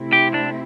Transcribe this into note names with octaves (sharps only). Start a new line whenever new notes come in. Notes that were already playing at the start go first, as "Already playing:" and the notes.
Already playing: C3 A3 C4 E4
G4
D4